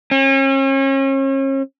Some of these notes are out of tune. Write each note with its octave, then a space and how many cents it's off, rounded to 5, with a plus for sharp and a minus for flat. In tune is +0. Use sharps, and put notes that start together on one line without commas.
C#4 -40